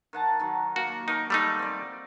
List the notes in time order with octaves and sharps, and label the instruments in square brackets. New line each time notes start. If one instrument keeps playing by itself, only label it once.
[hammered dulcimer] D#3 F#5 A5
D#3 F#3 C#6
[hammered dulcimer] A#3 C#6 [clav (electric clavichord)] F#4
[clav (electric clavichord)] D#4 [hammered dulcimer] A#4 C#6
[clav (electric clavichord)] G3 A3 D#4
[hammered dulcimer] C4 D5